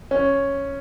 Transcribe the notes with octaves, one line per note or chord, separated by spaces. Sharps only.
C#4